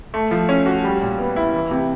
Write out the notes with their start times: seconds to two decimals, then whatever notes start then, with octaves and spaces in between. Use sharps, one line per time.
0.14 A3
0.31 F3
0.49 C#4
0.66 F#4
0.84 G3
1.02 A#2
1.18 B3
1.36 E4
1.54 E3
1.71 C3